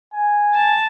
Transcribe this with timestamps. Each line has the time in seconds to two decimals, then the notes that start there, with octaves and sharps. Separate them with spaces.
0.13 G#5
0.54 A5